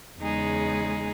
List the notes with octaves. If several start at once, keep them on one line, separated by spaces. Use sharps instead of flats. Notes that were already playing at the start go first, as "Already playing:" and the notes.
E2 C#3 G#3 D#4 G#4